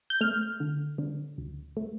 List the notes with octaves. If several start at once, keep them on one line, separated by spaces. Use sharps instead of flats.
G6
A3 F6
D3
D3
D2
A3